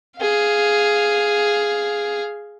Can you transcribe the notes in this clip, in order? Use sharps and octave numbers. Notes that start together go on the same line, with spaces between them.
G#4 F5